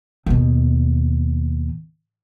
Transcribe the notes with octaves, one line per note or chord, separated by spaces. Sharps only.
D#2 B2